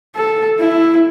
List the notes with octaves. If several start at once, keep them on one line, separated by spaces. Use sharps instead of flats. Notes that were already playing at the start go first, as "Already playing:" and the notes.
A4
E4